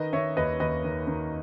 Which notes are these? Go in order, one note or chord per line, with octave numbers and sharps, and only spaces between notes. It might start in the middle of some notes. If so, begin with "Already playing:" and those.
Already playing: D#3 B4 D#5
D#3 C#5 E5
D#2 B4 D#5
D#2 B4 D#5
D#3
D#3